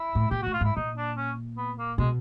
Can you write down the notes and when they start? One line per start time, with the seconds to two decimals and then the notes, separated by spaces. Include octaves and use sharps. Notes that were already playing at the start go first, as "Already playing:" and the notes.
Already playing: E4
0.15 A2
0.30 A#2 G4
0.42 A2 F#4
0.53 F4
0.61 G#2 E4
0.76 A#2 D#4
0.97 D4
1.17 C#4
1.57 B3
1.78 A#3
1.98 B2 G#3